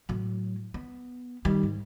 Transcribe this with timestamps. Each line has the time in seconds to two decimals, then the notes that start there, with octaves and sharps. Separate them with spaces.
0.09 A2 F#3
0.74 B3
1.45 D#3 G3
1.63 G#2